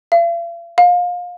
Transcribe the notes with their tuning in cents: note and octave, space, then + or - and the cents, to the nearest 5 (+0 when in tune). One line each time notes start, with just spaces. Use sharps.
F5 -45
F5 +30